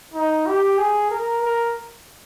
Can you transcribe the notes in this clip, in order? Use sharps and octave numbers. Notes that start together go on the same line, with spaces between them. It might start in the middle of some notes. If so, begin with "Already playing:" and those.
D#4
G4
G#4
A#4
A#4